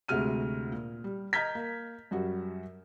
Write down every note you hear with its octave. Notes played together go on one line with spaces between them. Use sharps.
D2 C3 G#3 F#4 F6 D#7
A#2
G3
D#5 A#5 F6 G6 G#6 B6
A#3
F#2 G3 F#4